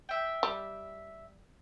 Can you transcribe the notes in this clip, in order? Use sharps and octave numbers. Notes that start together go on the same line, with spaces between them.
E5 G5
G3